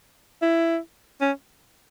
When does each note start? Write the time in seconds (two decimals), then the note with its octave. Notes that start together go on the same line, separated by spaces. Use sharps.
0.42 E4
1.21 C#4